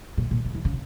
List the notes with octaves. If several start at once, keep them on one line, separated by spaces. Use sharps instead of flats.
A#2
A#2
C#3
E3
C#3